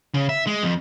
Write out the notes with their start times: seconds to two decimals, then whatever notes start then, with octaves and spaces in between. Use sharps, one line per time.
0.14 C#3
0.29 E5
0.47 G#3
0.63 F2